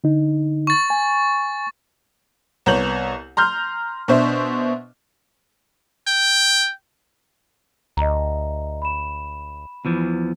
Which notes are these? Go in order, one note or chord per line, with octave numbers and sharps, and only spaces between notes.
D3 D#4
C#6 A6
G#5
C2 B3 C#5 A#5 G6 F#7
A#5 C6 F6 G6
B2 D4 C5 E5
G5
D2 D#5 A#5
B5 E7
E2 E3 F3